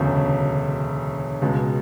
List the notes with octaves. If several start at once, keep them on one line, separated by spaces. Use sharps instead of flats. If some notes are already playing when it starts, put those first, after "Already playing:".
Already playing: E1 D2 C#3 F#3 A3
C#2 B2 G#3